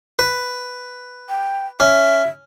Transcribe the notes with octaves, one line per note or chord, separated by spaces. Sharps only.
B4
G5
C#4 E5